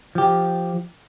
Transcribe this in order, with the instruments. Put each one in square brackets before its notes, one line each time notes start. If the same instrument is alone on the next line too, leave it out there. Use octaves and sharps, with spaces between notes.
[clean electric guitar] F3 G4